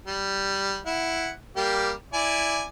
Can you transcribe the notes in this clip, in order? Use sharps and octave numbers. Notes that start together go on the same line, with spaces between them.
G3
E4 F#5
G3 A#3 G4
E4 D5 G#5